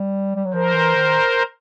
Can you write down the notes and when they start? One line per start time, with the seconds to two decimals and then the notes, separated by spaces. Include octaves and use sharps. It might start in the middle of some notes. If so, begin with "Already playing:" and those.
Already playing: G3
0.36 G3
0.45 F#3
0.53 F3 A#4 C5
0.74 E3
0.96 D#3